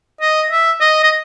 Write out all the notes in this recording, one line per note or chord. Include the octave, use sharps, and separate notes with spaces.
D#5
E5
D#5
D#5